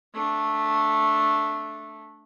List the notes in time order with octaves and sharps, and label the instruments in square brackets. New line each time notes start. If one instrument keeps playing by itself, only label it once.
[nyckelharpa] A3 D4